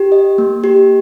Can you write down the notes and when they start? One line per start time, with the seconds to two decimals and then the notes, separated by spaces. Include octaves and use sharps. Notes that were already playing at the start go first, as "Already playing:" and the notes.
Already playing: G4
0.12 D#5
0.38 A#3
0.64 G4